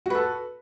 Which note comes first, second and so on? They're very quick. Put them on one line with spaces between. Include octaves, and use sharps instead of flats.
F#4 B4 A4